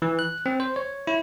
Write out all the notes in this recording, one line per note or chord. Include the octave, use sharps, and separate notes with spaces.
E3
F#6
C4
C5
C#5
E4